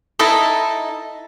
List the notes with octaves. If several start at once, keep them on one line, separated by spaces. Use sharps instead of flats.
D#4 E4 A4 D#5